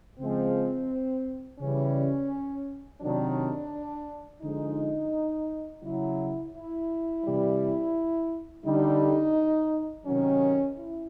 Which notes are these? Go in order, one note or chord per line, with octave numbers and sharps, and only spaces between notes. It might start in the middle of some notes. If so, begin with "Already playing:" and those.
C#3 F3 G#3 C4
C#3 E3 G3 C#4
C3 D#3 F#3 D4
D3 F3 G#3 D#4
C#3 F#3 E4
E4
C3 E3 G3
D3 G3 D#4
C3 D#3 F#3 C#4
E4